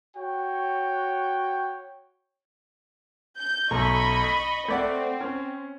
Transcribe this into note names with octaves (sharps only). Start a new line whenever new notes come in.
F#4 C#5 G5
G6
B1 A3 D#5 A#5 B5 C#6
B6
A3 C4 D5 F#5
C#4